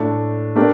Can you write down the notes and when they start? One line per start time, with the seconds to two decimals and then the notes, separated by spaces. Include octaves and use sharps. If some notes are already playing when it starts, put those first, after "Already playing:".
Already playing: A2 A3 D4
0.56 A3 D4 G4 A#4